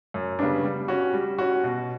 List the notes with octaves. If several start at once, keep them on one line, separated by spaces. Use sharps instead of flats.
F#2
C#3 G3 B3 D4
G3
C#4 F#4
G3
C#4 F#4
B2